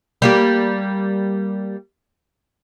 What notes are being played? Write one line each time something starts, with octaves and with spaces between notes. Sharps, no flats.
G3 A#3 G4